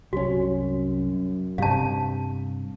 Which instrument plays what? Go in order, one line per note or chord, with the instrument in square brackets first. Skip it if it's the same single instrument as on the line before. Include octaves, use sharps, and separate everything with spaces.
[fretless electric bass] C2 C#4 [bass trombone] F#2 [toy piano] F#4
[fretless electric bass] G2 C3 [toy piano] F5 A5